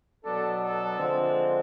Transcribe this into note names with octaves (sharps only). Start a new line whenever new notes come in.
B2 F#3 B3 D4 A4
A4
D3 F3 G#3 C4